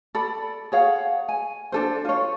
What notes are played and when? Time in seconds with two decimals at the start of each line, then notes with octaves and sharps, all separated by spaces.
0.15 A4 D5 B5
0.72 G#4 C#5 F5 F#5
1.29 G#5
1.72 D4 A4 C5
2.05 F4 C#5